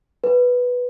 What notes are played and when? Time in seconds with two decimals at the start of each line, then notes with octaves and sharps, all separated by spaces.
0.24 B4